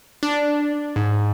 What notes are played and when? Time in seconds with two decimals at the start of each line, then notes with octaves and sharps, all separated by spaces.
0.23 D4
0.96 G#2